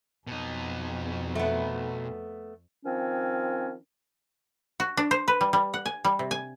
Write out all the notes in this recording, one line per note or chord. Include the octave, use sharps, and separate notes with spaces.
F2 B2 D#4
A3 B3
D#3 F3 C4 C#4
F#4
D4
C5
B4
G3
G3
F#5
G#5
G3
C3
G#5